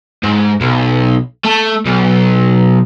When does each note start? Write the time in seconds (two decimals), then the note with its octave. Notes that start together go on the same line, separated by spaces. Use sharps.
0.23 G#2
0.61 B1
1.44 A3
1.86 B1